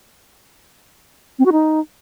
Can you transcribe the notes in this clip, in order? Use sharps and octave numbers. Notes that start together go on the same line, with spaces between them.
C4
F#4
D#4